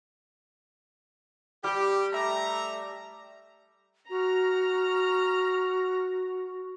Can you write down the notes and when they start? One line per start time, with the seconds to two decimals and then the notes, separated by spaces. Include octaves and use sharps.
1.64 G3 G4
2.13 A3 E5 A#5
4.10 F#4 A#5 F6